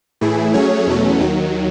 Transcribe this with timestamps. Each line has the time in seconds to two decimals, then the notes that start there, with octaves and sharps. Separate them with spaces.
0.21 A2 E3 A3 E4 G#4
0.54 F#3 A3 C#4 G#4 C#5
0.87 E2 B2 F#3 A3 C#4
1.20 D#2 D#3 F#3